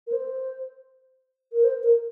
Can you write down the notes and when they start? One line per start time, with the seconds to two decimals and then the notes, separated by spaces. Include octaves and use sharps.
0.07 A#4
0.12 C5
1.52 A#4
1.64 C5
1.83 A#4